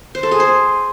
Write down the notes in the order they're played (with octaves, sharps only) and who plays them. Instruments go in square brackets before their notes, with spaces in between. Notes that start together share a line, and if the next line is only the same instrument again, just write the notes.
[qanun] C5
A4
G#4
C5